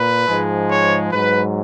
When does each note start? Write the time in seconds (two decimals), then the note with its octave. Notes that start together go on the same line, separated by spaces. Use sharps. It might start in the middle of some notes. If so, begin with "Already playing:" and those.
Already playing: A#2 B4
0.26 G#2 F3 G#3
0.69 C#5
1.12 G#2 F#3 B4